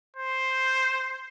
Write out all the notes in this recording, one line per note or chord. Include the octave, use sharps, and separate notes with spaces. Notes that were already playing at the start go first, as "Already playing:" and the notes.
C5